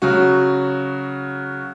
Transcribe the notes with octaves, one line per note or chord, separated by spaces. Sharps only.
C#3 F#3 F#4